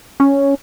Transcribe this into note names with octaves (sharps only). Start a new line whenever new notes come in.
C#4